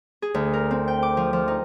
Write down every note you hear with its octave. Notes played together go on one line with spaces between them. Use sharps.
G#4
D2
A#4
C4
G5
D6
F3
F3
D#4